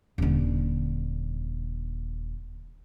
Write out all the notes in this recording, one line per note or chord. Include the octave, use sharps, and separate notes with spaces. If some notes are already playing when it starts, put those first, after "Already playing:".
D#1 D3